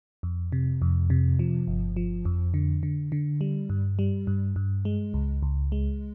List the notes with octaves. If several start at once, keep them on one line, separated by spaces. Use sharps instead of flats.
F2
C3
F2
C3
F3
G1
F3
F2
D3
D3
D3
G3
G2
G3
G2
G2
G#3
C#2
C#2
G#3